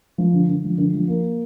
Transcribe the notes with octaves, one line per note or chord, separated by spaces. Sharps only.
F3
D3
D3
F3
D3
F3
A#3